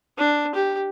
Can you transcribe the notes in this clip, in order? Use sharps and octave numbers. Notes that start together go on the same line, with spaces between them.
D4
G4